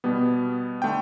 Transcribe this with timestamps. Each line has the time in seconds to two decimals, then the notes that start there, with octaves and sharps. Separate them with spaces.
0.04 B2 G3 B3
0.82 D3 A3 G5